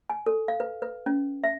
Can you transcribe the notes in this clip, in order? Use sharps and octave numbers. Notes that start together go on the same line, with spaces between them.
G#5
A4
F5
B4
B4
C#4
E5